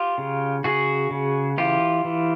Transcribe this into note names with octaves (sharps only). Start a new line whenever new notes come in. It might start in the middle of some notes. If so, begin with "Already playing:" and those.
Already playing: F4 G4
C#3
C#3 F#4 G#4
C#3
E3 F4 G4
E3